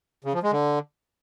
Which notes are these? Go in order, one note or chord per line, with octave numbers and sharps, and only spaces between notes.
C#3
F3
G#3
D3